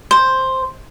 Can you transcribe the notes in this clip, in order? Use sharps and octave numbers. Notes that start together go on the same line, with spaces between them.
C5